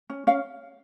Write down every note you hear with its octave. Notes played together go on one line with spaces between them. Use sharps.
C#4
C#4 F5